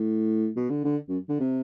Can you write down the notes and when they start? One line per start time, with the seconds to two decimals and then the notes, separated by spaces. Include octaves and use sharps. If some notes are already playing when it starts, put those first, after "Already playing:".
Already playing: A2
0.56 B2
0.70 D3
0.84 D3
1.09 F#2
1.29 D3
1.40 C3